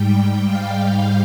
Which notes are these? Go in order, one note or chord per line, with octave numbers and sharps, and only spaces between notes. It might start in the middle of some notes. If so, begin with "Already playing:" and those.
Already playing: G#2 G3 G5
F5